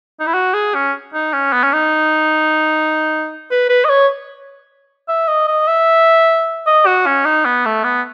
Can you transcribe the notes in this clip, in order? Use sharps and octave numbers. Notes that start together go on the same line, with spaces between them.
D#4
E4
F#4
G#4
C#4
D#4
C#4
B3
C#4
D#4
B4
B4
D#5
C#5
E5
D#5
D#5
E5
D#5
F#4
C#4
D#4
B3
A3
B3